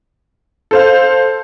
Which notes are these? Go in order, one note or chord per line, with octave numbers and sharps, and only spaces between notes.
A4 C5 F5